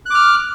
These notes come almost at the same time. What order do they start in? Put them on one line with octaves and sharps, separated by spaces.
F#6 D6 F6